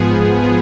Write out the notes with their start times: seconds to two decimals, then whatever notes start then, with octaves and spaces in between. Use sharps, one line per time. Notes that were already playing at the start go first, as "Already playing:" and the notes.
Already playing: G#2 F3 B3 G#4
0.42 F3 B3